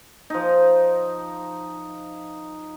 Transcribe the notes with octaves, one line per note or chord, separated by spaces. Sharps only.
F3 D#4